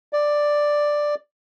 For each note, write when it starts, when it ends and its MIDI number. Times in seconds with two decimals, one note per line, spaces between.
0.13 1.15 74